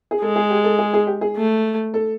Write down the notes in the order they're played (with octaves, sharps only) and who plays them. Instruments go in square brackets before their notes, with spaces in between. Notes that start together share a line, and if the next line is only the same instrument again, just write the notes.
[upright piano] G#4
[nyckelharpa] G#3 [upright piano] A4
[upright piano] G#4
G4
A4
G#4
G#4
G4
G#4
[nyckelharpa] A3
[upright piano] A4